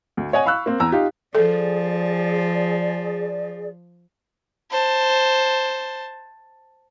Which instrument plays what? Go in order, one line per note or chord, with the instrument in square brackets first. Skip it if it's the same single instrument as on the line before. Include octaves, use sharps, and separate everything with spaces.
[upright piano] D2
C#5 D#5 F#5 G#5
F5 B5 C#6 E6 F#6
A#3 C4
E2 A#5 E6
D#4 F4 G4
[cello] F3 [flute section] G#4 D5 [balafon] A4
[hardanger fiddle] C5 A5